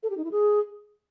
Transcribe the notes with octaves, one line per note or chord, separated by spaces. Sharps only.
A4
G4
D#4
E4
G#4